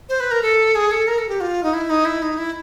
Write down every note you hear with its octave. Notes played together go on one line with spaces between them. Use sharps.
C5
B4
A#4
A4
G#4
A4
A#4
A4
G4
F4
D#4
E4
D#4
E4
D#4
E4